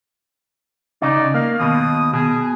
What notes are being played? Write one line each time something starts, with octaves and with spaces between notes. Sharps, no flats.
C#3 D#4 D5
A#3 F5
D#2 B2 D#6
B2 G#4